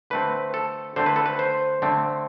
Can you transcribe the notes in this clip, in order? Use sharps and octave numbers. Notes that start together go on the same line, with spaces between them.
D3 A3 C4 B4
A4
D3 A3 C4 C5
B4
A4
B4
C5
D3 A3 C4